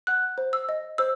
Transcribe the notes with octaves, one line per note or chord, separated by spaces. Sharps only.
F#5 F#6
C5
E6
D#5
C5 E6